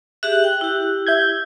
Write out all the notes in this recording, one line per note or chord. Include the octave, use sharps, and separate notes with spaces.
G4 G#4 E5 F#6
G5
E4 G4
E5 G6 G#6